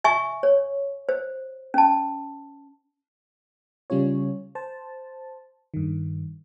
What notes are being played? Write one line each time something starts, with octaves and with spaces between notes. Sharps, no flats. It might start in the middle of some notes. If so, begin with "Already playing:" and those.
E5 G#5 C#6
C#5
C5
C#4 A5
C#3 G3 C#4 F4 C#5
C5 A5
G2 D#3